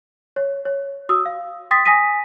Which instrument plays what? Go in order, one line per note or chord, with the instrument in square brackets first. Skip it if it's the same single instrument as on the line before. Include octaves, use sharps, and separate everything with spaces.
[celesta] C#5
C#5
F#4 D#6 E6
F5
G5 C6 D#6 A6 B6
G#5 D#6 A#6 B6 D#7